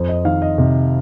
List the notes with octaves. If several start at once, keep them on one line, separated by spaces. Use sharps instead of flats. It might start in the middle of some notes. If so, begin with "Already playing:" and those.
Already playing: F2 C5
D#5
D#3 F5
D#5
C3